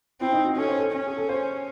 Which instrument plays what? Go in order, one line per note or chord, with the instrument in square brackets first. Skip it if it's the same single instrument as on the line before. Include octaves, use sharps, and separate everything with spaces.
[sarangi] C4 [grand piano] E4
[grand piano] D#4
F#4
[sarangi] C#4 [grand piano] A4
[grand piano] C5
A4
[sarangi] C#4
[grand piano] G#4
A4
C5